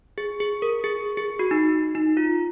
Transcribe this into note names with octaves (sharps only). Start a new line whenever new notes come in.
G#4
G#4
A#4
G#4
G#4
F#4
D#4
D#4
F4